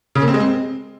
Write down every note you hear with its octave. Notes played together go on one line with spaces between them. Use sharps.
C#3
A#3
C4
G#3
C4